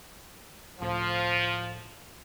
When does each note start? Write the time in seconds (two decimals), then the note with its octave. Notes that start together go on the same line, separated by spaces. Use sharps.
0.80 C#2 A2 F3